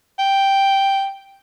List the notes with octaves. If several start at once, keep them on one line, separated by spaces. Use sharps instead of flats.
G5